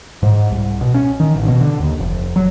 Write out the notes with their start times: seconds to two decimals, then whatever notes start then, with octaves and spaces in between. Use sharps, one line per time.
0.23 G#2
0.51 C2
0.81 B2
0.94 C#4
1.20 D#3
1.35 A1
1.48 B2
1.61 D3
1.80 D#2
1.99 F1
2.36 F#3